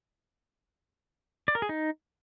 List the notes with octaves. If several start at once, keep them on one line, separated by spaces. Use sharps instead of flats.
D5
A#4
G#4
D#4